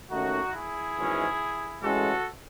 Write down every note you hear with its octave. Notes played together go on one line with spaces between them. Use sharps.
D#2 D#3 A3 C#4 D#4 F#4
E4 G#4
G#1 G#2 E3 G#3 C#4
A1 A2 G#3 C#4 F#4 A4